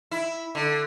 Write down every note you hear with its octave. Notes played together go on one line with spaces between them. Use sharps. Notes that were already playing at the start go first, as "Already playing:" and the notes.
E4
D3